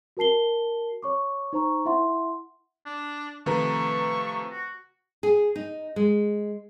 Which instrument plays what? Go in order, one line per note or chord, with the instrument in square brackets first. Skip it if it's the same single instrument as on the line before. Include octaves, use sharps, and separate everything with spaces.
[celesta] F#4 A#4 A5 C7 G7
C#5 C#6 D6
D#4 C5 A#5 C#6
E4 E5 F#5 C6
[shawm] D4
[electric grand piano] C3 F3 A3 [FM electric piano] D#3 B4 A#5 [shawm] C#6
[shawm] F#4
[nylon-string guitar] G#4
D#4
G#3